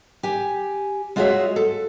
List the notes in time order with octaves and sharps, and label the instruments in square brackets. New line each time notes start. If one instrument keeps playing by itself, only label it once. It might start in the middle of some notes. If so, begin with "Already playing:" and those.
[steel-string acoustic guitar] G4 G#5
G#3 F4 F#4 G#4 C#5 E5
A4